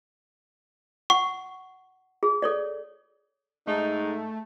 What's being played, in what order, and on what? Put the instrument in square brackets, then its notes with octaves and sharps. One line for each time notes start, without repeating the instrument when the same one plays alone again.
[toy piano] F#5 [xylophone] C#6
[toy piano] G#4
A4 C#5 D5
[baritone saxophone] G#2 [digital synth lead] A3 [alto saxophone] D#4